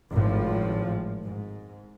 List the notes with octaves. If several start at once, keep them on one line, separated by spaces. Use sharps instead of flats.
G#1 A2 F3
G#2